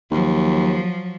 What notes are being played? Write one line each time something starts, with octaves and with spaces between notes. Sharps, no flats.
D#2 F3 F#3